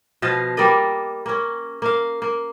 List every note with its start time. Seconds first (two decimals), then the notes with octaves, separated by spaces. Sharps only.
0.22 B2 F3 D#5 F5
0.57 G3 A#3 D5 D#5
1.26 A#3 C#4
1.82 A#3 F5
2.22 A#3